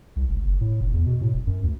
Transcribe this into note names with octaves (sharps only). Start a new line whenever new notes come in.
C2
E1
F#1
A2
F1
E2
B2
A2
D#1
F#2
D2